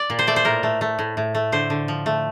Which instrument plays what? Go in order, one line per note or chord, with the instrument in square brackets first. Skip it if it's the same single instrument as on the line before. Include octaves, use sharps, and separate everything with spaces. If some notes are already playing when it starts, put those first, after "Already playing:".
Already playing: [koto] D5
A#2
C5
A3 D5
C5
A2 A#4
A3
A3
A2
A2
A3
D3 C5
D3
F3
A3